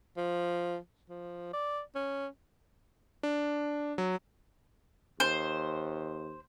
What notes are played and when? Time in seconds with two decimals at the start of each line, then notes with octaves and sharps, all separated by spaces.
0.17 F3
1.09 F3
1.53 D5
1.95 C#4
3.23 D4
3.98 F#3
5.20 D#2 C5